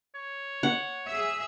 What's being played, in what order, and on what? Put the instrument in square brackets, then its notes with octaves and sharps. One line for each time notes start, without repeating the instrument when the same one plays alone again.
[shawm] C#5
[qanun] F#5
[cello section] G#4 E5